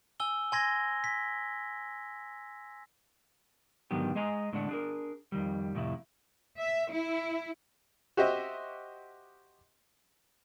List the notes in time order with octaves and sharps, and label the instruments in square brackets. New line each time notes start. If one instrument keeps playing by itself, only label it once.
[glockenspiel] G#5 E6 G7
G#5 C6 G#6 A#6
B6
[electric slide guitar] G#2 D3 D#3 F#3 B3 G4
G#3 G#4 D#5 G#5 A#5
A2 D3 G#3 D4 F#5
D4 G#4 A#4
F2 D#3 G3
F2 A2 C3 E4
[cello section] E5
E4
[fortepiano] F#4 G4 C5 D#5 E5